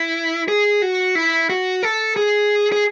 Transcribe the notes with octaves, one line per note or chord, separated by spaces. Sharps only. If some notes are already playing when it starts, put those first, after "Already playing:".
Already playing: E4
G#4
F#4
E4
F#4
A4
G#4
G#4